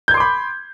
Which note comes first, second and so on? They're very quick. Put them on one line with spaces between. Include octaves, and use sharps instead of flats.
G6 G#6 C6 D6 B5